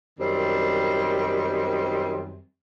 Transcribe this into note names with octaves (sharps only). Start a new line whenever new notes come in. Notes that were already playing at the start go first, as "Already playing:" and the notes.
F#2 D#3 G3 C4